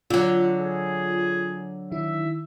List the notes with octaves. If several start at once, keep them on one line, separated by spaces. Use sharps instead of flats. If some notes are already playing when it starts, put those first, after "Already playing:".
D3 F#3 F4
G#4
D#3 E4 E5